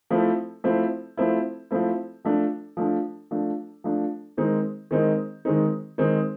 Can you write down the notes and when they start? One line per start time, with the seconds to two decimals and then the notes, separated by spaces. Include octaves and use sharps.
0.11 F3 A3 C4 E4
0.64 F3 A3 C4 E4
1.17 F3 A3 C4 E4
1.71 F3 A3 C4 E4
2.25 F3 A3 D4
2.77 F3 A3 D4
3.31 F3 A3 D4
3.84 F3 A3 D4
4.37 D#3 G#3 C4 D#4
4.91 D#3 G#3 C4 D#4
5.45 D#3 G#3 C4 D#4
5.98 D#3 G#3 C4 D#4